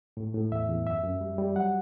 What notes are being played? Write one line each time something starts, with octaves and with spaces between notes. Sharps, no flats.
A2
A2
E2 E5
E2
F#2 E5
F#2
G3
G3
F#3 F#5